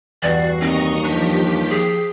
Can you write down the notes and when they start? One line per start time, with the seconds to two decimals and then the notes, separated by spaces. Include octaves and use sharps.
0.23 E2 G2 F#4 D5 C7
0.61 D#2 C4 D#5 A#5 C#6
1.03 F3 D4 G4 B6
1.69 G#4